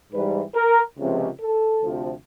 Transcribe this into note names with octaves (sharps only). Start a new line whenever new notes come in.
G#2 E3 G3 B4
A#4
C#2 C3 F3
A4
D2 C3 F3